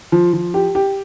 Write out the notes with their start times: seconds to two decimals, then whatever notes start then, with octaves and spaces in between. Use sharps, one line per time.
0.12 F3
0.33 F3
0.54 G4
0.75 G4